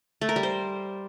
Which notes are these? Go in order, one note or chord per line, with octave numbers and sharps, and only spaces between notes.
A3
A#4
G3
C5